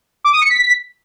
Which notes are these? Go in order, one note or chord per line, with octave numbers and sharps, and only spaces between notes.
D6
D#6
C#7
B6